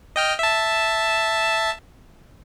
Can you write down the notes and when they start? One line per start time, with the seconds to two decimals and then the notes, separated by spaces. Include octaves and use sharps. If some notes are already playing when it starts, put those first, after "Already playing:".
0.16 D#5 G5 F6
0.39 E5 A5